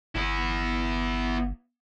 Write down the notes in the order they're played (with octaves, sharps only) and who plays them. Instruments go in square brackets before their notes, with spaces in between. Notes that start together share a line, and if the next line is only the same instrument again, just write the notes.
[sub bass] G1 [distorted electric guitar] B3 E4